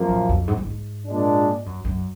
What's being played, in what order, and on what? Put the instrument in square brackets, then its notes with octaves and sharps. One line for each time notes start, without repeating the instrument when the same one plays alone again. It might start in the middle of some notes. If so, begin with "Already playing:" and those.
Already playing: [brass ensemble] F#2 F3 A#3
[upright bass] A#2
F2
G#2
F#2
G#2
[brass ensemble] A#2 G#3 D4
[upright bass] F#2
F#2